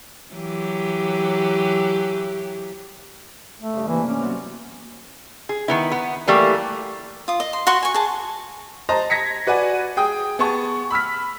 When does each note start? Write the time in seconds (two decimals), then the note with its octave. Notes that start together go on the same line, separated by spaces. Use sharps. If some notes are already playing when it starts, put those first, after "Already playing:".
0.35 E3 F#3 G4
3.59 A3
3.73 G2 C#3
3.88 C3 E3 A#3
4.07 C#4 D6 F6
4.21 F#3 B3 C4
5.49 G#4
5.68 D#3 B3 E4
5.92 B3
6.27 E3 G3 A3 A#3
7.28 F4 D#6
7.40 D#5
7.53 C6
7.67 F#4 F#5 C6 C#6
7.83 G#5 C#6
7.94 G#4 A5
8.89 C5 D#5 A5 A#5
9.10 G#6 A#6 B6 C#7
9.47 F#4 B4 D5 F#5 G#5
9.97 G#4 G5 D#6
10.39 B3 G#4 A5 C#6
10.91 B5 E6 F6 B6